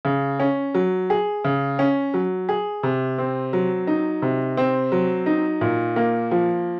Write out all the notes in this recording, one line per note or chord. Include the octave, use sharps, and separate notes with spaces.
C#3
C#4
F#3
G#4
C#3
C#4
F#3
G#4
C3
C4
F#3
D#4
C3
C4
F#3
D#4
A#2
A#3
F3